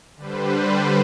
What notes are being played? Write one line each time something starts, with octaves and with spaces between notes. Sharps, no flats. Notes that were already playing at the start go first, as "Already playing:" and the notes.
D3 G3 B4 C5